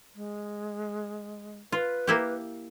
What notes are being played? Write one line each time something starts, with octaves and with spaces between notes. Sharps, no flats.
G#3
F4 B4
A#3 E4 G4